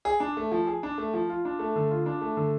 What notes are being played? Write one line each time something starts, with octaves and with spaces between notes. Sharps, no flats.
G#4
D4
A3
F3
G#4
D4
A3
F3
F4
D4
A3
D3
F4
D4
A3
D3